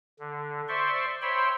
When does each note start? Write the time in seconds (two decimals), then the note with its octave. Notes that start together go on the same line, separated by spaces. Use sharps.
0.19 D3
0.68 C5 D5 E5 C6 C#6
1.22 C5 C#5 E5 G5 B5 C6